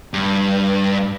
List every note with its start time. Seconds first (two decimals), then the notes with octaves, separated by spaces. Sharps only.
0.14 G2